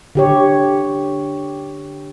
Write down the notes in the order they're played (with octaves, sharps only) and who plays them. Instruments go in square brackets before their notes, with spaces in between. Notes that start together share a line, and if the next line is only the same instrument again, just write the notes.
[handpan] D3 G4 C#5